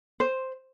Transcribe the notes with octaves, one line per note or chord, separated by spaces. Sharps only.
C5